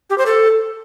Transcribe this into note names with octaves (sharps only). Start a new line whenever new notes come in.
G4
C5
A4